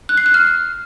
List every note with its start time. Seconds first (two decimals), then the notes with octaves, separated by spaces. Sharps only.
0.09 F#6
0.18 C7
0.26 F#6
0.34 F6